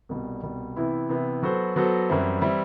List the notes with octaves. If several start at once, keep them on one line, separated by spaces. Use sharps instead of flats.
C2 B2 G3
C2 B2 G3
C3 E3 B3 E4
C3 E3 B3 E4
F#3 B3 F#4 A4 C5
F#3 B3 F#4 A4 C5
F#2 E3 G3 C4 E4
E3 G3 C4 E4